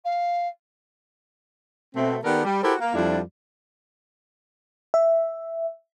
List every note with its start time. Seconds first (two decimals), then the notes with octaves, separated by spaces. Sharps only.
0.04 F5
1.95 B2 A3 C4
2.24 D#3 B3 G4 A4 A#4 D5
2.45 G3
2.63 E4 F#4 G4 A4 A#4 C5
2.80 A#3
2.94 F2 F3 G3 D4 E4 D5
4.94 E5